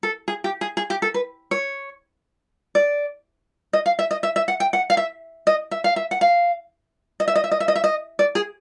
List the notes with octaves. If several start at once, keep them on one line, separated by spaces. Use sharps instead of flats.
A4
G#4
G4
G#4
G#4
G4
A4
B4
C#5
D5
D#5
F5
E5
D#5
E5
E5
F#5
G5
F#5
F5
E5
D#5
E5
F5
E5
F#5
F5
D#5
E5
D#5
E5
D#5
E5
D#5
E5
D#5
D5
G#4